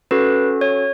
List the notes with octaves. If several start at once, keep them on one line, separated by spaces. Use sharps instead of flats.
C#4 F#4 A4 B4
C#5